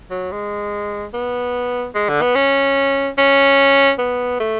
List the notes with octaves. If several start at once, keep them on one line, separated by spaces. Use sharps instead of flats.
F#3
G#3
B3
G#3
D3
B3
C#4
C#4
B3
A3